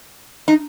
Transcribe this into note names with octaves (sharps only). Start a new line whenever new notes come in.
D#4